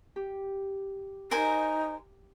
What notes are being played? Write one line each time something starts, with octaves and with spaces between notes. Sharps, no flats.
G4
D#4 A#4 C5 G#5